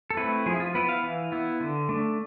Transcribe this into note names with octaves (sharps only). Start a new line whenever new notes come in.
A4
A3 C4 E4 B4
F3 G#4
E4
F4
B3 E4 B4
F5
E3
B3 E4
D3
A3 D4